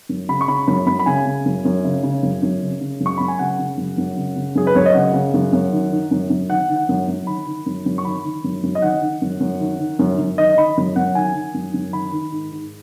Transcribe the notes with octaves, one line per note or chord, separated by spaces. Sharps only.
F#2
C#3 B5
C#6
C#3 B5
F#2 B5
F#2 B5
B5
C#3 G#5
C#3
F#2
F#2
C#3
C#3
F#2
F#2
C#3
C#3
F#2
C#6
F#2 B5
G#5
C#3 F#5
C#3
F#2
F#2
C#3
C#3
F#2 G#4
B4
F#2 C#5
D#5
C#3 F#5
C#3
F#2
F#2
D#3
D#3
F#2
F#2
D#3 F#5
D#3
F#5
F#2
F#2
D#3 B5
D#3
F#2
F#2
C#6
D#3 B5
D#3
F#2
F#2
D#5
D#3 F#5
D#3
F#2
F#2
D#3
D#3
F#2
F#2
D#3 D#5
D#3 B5
F#2
F#2 F#5
D#3 G#5
D#3
F#2
F#2
D#3 B5
D#3
G#2
G#2